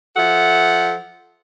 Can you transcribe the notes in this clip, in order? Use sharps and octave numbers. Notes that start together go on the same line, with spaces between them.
F3 A4 E5 F#5